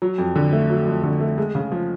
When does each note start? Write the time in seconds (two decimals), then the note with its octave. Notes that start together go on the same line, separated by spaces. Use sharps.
0.02 F#3
0.18 F2
0.35 D3
0.53 A3
0.70 F#3
0.87 F2
1.03 D3
1.21 A3
1.38 G#3
1.55 C#3
1.72 F3